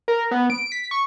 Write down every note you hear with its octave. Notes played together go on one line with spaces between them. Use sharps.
A#4
B3
D7
B6
C#6